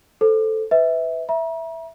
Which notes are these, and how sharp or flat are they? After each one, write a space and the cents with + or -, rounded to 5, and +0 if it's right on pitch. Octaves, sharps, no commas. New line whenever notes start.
A4 +0 C5 +0
B4 +20 E5 -20
E5 +0 A#5 +40